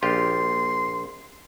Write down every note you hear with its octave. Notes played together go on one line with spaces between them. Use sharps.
A#1 F4 G4 C6